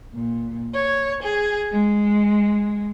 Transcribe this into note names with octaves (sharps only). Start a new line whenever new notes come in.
A#2
C#5
G#4
G#3